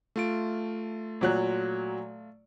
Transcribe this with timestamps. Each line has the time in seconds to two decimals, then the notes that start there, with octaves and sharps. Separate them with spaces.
0.16 A3 F4 D7
1.21 A#2 F#3 F#6